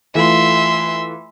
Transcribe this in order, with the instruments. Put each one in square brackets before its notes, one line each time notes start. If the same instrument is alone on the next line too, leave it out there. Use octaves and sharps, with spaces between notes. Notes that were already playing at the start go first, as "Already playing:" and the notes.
[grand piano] E3 A3 F4 [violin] E5 C6